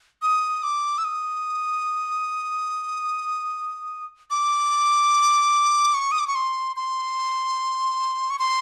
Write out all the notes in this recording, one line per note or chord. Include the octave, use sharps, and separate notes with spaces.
D#6
D6
E6
D#6
D6
C#6
D#6
D6
C#6
C6
C6
C#6
C6